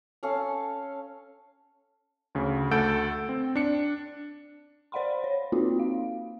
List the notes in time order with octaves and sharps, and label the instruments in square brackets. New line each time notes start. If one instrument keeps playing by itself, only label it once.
[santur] C#4 A4 F5
[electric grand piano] D2 C#3
D2 A3 A4 F#5 G6 D7
C4
D4 C#7
[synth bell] C5 D5 F5 F#5 B5 C6
C#5
A#3 C4 D#4 F4 F#4
F5